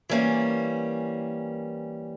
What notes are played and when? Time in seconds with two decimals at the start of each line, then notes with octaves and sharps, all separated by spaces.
0.10 E3 G3 A#3 C#4